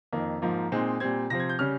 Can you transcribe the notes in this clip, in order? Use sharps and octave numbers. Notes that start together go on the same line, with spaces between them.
F2 D#3 A#3
G#2 F3 A#3
A#2 G#3 C4 D#4
A#2 G3 C4 G#6
C3 F3 C4 A#6
G#6
G6
C#3 G3 C#4 F6